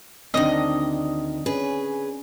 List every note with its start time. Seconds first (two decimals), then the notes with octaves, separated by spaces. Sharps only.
0.34 D2 D#3 C4 D4 D#5
1.46 C#4 G#4 B4